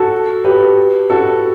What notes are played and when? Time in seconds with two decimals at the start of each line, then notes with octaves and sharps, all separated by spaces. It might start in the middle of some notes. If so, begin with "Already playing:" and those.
Already playing: F#4 A4
0.45 G4 B4
1.10 F#4 A4